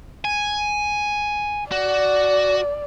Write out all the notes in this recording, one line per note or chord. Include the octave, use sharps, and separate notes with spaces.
G#5
F#4 D5